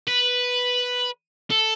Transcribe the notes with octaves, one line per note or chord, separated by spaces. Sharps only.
B4
A4